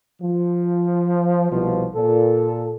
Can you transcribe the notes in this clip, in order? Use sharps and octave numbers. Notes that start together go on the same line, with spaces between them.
F3
C2 B2 F3
A#2 A4